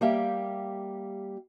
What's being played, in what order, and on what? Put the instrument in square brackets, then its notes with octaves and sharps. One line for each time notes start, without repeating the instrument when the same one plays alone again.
[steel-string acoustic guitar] G3 A#3 G4 E5 F5 G5